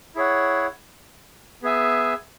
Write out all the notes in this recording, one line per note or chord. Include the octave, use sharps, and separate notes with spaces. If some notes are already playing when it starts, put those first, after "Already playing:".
E4 G#4 C#5 F#5
B3 G#4 E5 G#5